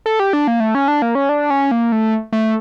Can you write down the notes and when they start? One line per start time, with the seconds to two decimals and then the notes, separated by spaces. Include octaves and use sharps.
0.06 A4
0.20 G4
0.33 D4
0.48 A#3
0.60 A3
0.75 C#4
0.88 D4
1.02 A#3
1.15 C#4
1.29 D4
1.50 C#4
1.71 A#3
1.92 A3
2.33 A3